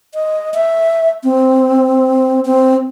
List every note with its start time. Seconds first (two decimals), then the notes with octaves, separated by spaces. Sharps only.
0.14 D#5
0.54 E5
1.24 C4
2.45 C4